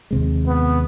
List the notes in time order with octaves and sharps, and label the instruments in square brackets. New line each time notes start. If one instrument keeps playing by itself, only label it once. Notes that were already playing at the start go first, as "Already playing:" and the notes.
[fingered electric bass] D#2 C3 G#3
[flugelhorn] B3